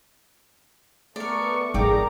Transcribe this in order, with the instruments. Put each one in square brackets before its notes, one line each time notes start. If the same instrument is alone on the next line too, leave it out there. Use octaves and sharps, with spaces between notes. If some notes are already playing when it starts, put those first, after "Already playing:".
[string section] A3 B3 C#6 [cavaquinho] A#4 D5
[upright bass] G#1 [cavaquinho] D#4 G5 D6 [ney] G#4 [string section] A#4 D5 A#5